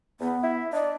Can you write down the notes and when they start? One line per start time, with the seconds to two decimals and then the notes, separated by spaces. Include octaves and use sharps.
0.20 E2 B3
0.43 E4 E5
0.73 D4 D5 D#5